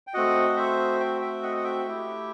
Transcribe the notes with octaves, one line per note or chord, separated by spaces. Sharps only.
G5
A3 C4 F#4 D#5 F#5
F#5
C5 E5
E5 G5
E5 G5
D#5 F#5
F#5
E5 G5
A3 E4 G4